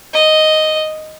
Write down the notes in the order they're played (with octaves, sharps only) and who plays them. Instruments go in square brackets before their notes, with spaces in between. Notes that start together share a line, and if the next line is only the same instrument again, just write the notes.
[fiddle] D#5